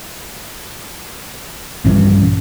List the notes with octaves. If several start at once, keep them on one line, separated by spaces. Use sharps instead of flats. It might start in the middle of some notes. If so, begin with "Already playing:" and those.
A#1 G2 E3 C#4